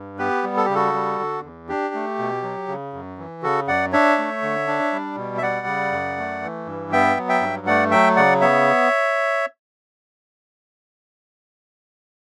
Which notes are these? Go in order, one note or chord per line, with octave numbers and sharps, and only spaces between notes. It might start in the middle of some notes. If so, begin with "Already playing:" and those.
Already playing: G2
B3 G4 B4
G3
A4
C#3 G4
F#4 A4
G3
D3
E2
D4 G4
A3
B2
F#3
C#3
F#2
E3
C#3 F#4 A4
F#2 D5 F#5
D4 C#5 E5
A3
D3
D4
G3
B2
E5
G3 D5 F#5
C#3
F#2
A3
E3
G2
B3 E5 G5
F#3
E5 G5
G2
A3 D5 F#5
F#3 E5 G5
C#3 D5 F#5
B3 C#5 E5